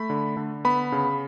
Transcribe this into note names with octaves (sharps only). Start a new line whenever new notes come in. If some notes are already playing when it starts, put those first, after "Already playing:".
Already playing: A3 B5
D3
D3
B3 B5
C#3